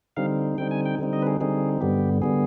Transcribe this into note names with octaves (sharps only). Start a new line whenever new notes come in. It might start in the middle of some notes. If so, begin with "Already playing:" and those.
D3 G3 C4 D#4 F5
D3 G3 C4 D#4 G5
G#5
G5
D3 G3 C4 D#4
D#5
B4
G#4
D3 G3 C4 D#4 G#4
G2 D3 G3 B3 G4
D3 G3 B3 G#4